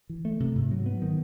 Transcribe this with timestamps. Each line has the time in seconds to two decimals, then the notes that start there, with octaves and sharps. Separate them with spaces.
0.09 E3
0.25 A3
0.40 C3
0.55 G#2
0.71 F#3
0.86 B3
1.02 D#3